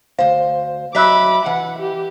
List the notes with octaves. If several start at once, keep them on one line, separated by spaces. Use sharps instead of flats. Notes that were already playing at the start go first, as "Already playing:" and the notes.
D2 C5 F5
F#3 D#5 E5 B5 D6 E6 F#6 B6
E3 F#5
G4